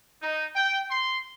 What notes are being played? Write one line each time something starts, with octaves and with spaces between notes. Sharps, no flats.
D#4
G5
C6